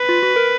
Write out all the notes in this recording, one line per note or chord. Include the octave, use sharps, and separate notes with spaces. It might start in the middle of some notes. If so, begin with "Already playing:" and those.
Already playing: B4
F4
F#4
A#4